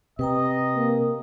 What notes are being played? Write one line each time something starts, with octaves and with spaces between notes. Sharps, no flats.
C3 B4 D#5 G5 A#5
A#3